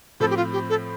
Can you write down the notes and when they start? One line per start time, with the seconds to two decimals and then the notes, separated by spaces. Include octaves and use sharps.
0.20 A2 F3 C4 A4
0.31 G4
0.37 F4
0.53 G4
0.70 A4